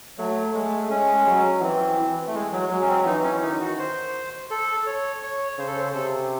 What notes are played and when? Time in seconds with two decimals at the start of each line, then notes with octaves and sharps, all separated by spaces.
0.18 F#3 A3
0.54 G#3 A3
0.90 G#3 C#4
1.27 F#3
1.62 E3 C4
1.99 E3
2.27 A3
2.35 G#3
2.53 F#3
2.70 F#3 G#3
2.82 C#4
2.88 C4
3.06 E3 D#4
3.24 C#4
3.42 D#3 D#4
3.60 F#4
3.79 C5
4.51 A4
4.86 C#5
5.23 C#5
5.58 C#3 C5
5.67 A4
5.76 C5
5.94 C3 A4